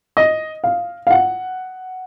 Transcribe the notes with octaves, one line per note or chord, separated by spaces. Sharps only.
D#5
F5
F5
F#5